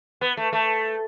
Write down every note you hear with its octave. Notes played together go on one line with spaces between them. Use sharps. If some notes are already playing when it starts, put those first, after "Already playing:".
B3
A3
A3